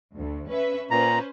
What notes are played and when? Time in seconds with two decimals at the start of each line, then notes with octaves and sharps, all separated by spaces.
0.15 D2
0.49 C#4 B4 E5
0.91 A#2 C#4 B4 C5 A#5